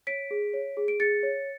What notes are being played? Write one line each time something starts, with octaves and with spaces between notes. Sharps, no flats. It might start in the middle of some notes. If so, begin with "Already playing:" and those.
C#5 B6 D7
G#4
C#5
G#4
D7
G#4 A6 C#7
C#5